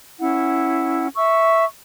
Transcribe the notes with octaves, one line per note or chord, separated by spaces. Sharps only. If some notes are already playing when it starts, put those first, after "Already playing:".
C#4 E4 F#5
E5 C#6 E6